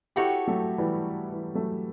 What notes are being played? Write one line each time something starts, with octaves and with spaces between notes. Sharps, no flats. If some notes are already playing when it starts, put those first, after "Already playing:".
E4 F#4 G4 A4 C#5 G5
F#3 A3
E3 G3
E3
F#3 A3